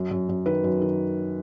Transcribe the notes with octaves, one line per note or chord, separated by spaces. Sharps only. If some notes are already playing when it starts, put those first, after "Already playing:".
Already playing: F#2
F#2
F#2
D#3 B4
F#2
D#3